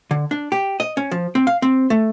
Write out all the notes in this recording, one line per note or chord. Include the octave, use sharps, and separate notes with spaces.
D3
D4
G4
D#5
C#4
F3
C4
F5
C4
A3